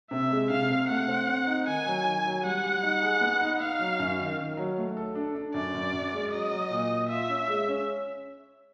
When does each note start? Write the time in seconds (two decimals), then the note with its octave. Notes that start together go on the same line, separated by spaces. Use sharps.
0.11 C3 E5
0.31 G#3
0.50 C3 F5
0.70 C3
0.89 A3 F#5
1.08 C4
1.28 C4
1.47 D#4
1.67 D#3 G#5
1.86 F#3
2.05 D#3
2.25 F#3
2.44 G3 F#5
2.64 G3
2.83 D#4
3.02 G#4
3.21 B3
3.41 D#4
3.60 D#4 F5
3.79 F#3
3.99 F#2
4.19 D#3
4.39 D#3
4.57 F#3
4.77 A3
4.97 A4
5.15 D4
5.35 D4
5.54 F#2 D5
5.74 F#2
5.93 F#2
6.13 G#3
6.32 F#3 D#5
6.51 F#3
6.70 A#2
6.90 A#2
7.09 F4 E5
7.29 C#4
7.48 G#3
7.68 C#4